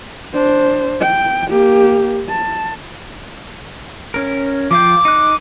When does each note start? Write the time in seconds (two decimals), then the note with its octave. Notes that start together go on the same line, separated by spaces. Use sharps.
0.33 D4 C5
1.01 G5
1.50 A#3 G4
2.29 A5
4.14 C#4 A#4
4.71 F3 F4 G5 D6
5.05 D#4 F#6